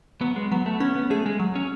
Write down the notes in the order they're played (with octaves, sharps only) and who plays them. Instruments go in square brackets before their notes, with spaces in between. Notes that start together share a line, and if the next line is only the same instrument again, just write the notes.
[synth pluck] F#3 [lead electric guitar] B3
[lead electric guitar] G#3
[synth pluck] F#3 [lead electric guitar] B3
[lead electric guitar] A3
[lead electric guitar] B3 [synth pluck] C#4
[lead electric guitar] B3
[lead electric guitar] A3 [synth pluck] G#4
[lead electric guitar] G#3
[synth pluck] F#3
[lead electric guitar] C#4